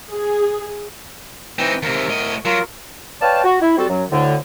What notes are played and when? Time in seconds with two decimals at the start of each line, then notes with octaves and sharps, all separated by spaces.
0.11 G#4
1.59 E3 C4 D#4 G5
1.83 D#2 C3 A#4
2.09 A2 D#5
2.45 F#3 F4 A#4
3.21 B4 C#5 D5 F5 G5 A5
3.44 F#4
3.61 E4
3.77 G3 C4 F#4 A4
3.89 F#2 F#3
4.11 D2 A2 D3